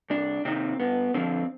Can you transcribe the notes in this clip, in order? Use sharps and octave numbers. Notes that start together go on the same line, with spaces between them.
C2 D4
C3 D#3 C4
G2 B3
D3 F3 C4